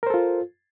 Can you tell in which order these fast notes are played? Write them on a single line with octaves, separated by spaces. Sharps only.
A#4 C5 A4 F4